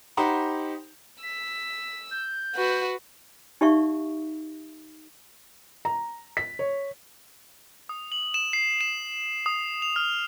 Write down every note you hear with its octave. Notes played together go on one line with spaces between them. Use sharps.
D#4 G4 C5 F#5 A#5 B5
E6 B6
G6
F#4 B4
D#4 G4 D5 E5 F5 C#6
A#5
B6
C#5
D#6
F#7
E7
C7
E7
D#6
F7
F6